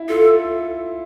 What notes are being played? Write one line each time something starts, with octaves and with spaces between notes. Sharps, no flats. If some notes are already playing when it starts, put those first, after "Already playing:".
Already playing: E4
F4 A4